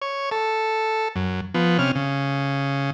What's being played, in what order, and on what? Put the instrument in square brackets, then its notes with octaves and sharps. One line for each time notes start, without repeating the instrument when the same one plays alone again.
[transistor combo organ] C#5
A4
F#2
F3 B3
C3 C#4 F6
C#3